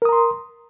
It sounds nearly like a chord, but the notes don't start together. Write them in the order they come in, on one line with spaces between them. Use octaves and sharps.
A#4 D#6 A#5 C6